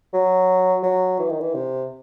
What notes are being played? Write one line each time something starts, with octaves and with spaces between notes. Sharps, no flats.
F#3
F#3
E3
D#3
E3
C3